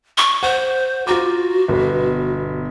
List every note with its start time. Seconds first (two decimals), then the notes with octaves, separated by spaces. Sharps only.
0.18 C#6
0.43 C5 F#5
1.07 F4 F#4 A#5 D6
1.68 G1 B2 B4